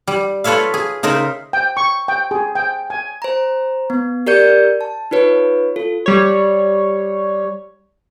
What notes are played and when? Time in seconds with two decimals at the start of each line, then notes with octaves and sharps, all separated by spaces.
0.07 G3
0.44 F4 A4 B4 C#5 E5 F5
0.74 G#4
1.03 C#3 D#4 A#4 C5 E5
1.53 G5
1.77 C#6
2.08 G5
2.31 G#4
2.55 G5
2.90 G#5
3.22 C5 A#5
3.90 B3
4.27 G4 A#4 D5 G6 C#7
4.81 A5
5.11 D#4 F4 B4 C#5
5.76 F4 A4
6.06 G3 C#5